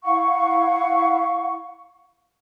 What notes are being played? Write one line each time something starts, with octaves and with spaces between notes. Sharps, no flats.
E4 F5 F#5 C#6